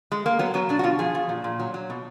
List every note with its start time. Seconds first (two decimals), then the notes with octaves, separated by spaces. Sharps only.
0.12 G#3
0.26 A#3
0.39 F#3 B3
0.54 F#3 B3
0.69 B2 D4
0.79 F#4
0.83 B2 F4
0.99 F3 G#4
1.15 F3
1.29 A#2
1.44 A#2
1.59 F#3
1.74 F#3
1.90 B2